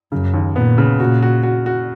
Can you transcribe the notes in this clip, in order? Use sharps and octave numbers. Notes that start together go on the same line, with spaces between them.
F#2 C#3
D#2
A#2 B3
C#3
A#2 F#4
F#4
F#4
F#4